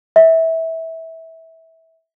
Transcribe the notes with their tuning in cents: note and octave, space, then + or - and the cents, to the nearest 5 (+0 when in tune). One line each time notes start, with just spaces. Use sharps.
E5 -20